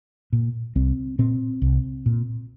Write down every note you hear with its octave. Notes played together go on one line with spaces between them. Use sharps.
A#2
C2 C4
A#2 C4
C2
A#2